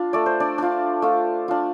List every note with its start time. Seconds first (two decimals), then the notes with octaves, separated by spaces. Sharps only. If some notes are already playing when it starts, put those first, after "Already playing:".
Already playing: D4 F4
0.13 A3 D5
0.26 C5
0.40 D4 D5
0.58 D4 F4
1.02 A3 F4
1.48 D4 F4